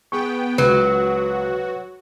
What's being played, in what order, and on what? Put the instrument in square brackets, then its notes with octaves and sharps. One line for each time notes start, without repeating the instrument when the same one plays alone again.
[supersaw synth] B3 G5 [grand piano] G#4 [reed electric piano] C#6
[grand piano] C#2 [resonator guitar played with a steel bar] F#3 [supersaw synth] F#4 [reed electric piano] B4